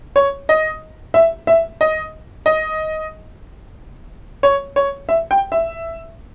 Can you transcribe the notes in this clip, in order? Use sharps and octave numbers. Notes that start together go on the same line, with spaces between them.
C#5
D#5
E5
E5
D#5
D#5
C#5
C#5
E5
G5
E5